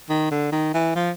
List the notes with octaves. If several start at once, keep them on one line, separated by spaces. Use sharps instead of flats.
D#3
D3
D#3
E3
F3